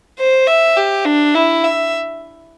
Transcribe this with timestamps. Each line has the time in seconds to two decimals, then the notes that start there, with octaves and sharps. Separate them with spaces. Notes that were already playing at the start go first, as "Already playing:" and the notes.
0.19 C5
0.47 E5
0.77 G4
1.06 D4
1.35 E4
1.64 E5